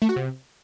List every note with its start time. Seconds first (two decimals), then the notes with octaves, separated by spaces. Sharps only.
0.02 A3
0.09 F#4
0.16 C3